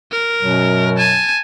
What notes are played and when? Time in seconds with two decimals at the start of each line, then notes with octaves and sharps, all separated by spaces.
0.12 A#4
0.42 F#2 B2 F#3
0.97 G#5 A5